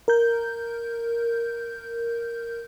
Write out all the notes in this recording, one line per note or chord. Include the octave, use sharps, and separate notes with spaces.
A#4 G6